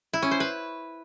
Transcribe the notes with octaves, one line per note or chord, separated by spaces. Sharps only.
E4
C#4
C5
B4